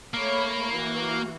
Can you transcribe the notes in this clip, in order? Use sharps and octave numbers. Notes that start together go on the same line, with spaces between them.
A3 A#3 C#5 B5
E3 F#4